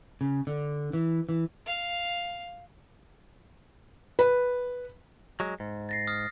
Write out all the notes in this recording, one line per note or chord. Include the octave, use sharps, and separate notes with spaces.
C#3
D3
E3
E3
F5
B4
F#3 G#3
G#2
A6 A#6 C7
D#6 F6